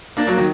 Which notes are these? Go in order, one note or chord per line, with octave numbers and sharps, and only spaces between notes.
A#3 D4
F#3 A#3
D#3 F#3